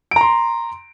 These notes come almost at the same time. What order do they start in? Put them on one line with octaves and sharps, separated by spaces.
D7 A#5 C6